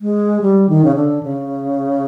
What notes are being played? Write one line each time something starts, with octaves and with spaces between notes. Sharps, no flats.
G#3
G3
D#3
C#3
D3
C#3